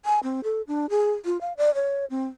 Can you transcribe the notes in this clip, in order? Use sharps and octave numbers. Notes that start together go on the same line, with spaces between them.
G#5
C4
A4
D4
G#4
F4
F5
D5
C#5
C4